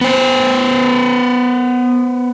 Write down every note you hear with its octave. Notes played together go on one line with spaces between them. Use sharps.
B3 C5